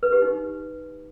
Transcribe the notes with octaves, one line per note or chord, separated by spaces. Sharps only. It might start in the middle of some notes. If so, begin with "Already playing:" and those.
B4
G4
D#4